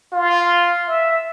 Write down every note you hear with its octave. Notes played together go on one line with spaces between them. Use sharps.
F4
E5